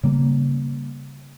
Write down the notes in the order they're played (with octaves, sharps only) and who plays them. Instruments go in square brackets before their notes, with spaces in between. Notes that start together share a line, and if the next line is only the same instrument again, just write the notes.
[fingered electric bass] C#3 G3 A#3